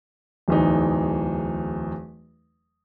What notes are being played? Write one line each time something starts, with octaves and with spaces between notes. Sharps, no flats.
D1 E2 D#4